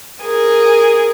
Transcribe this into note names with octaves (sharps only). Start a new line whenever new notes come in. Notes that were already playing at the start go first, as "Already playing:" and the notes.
G#4 A#4